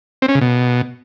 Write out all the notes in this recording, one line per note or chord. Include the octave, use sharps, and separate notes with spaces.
C4
C#4
C#3
B2